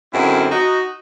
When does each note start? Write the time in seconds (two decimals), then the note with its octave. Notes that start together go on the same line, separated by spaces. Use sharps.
0.14 F#2 D3 G#3 C4 C#4 E4
0.52 D#4 F#4